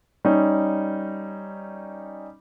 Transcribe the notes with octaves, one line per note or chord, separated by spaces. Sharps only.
G3 C#4 D#4